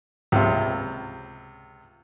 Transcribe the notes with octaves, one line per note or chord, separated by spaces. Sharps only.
C#2 C3